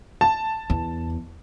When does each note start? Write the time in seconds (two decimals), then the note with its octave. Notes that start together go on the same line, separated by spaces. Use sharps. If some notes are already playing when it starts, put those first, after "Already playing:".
0.21 A5
0.70 E2